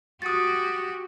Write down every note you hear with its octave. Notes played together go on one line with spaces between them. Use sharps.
F#4 G4 D#6 A6